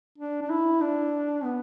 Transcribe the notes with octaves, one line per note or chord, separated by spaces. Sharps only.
D4
D4
E4
D4
B3